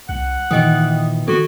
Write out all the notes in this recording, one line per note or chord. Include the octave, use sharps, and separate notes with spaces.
C2 F#5
A#2 D#3 E3 D#5 G5 D#6
D#3 F#4 A4 C#6